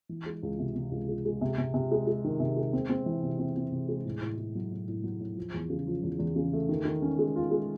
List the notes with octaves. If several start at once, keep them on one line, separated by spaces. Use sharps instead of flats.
E3
G#3
C#2
C3
C3
C#2
G#3
G#3
C3
C3
C3
G#3
G#3
D#3
C3
G#3
C4
C4
E3
C3
C4
C4
C3
G#3
A2
A2
A2
F#3
A2
A2
F#3
A2
F3
E2
C#3
F3
E2
E2
C#3
A3
D#3
D#3
C#4
G#3
F4
G#3